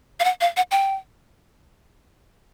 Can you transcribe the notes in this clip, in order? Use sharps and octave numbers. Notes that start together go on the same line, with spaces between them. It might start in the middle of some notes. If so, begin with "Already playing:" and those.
F5
F#5
F5
F#5
G5